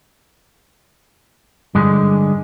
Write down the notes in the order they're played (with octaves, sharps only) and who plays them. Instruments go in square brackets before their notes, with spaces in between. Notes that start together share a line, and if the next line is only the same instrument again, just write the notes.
[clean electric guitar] G2 D3 G#3